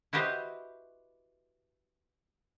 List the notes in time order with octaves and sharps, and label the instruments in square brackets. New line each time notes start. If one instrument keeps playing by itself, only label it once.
[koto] E4 F#4 G4 B4 C5 D#5